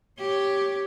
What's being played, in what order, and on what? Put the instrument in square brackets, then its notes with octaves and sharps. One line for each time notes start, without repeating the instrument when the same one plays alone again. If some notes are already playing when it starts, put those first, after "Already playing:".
[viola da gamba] G4 C#5